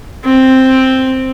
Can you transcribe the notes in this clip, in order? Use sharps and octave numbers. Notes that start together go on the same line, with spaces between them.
C4